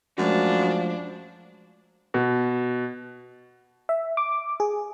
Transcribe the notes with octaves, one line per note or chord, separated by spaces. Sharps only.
F#2 F3 G#3 A3 D4 F#4
B2
E5
D6
G#4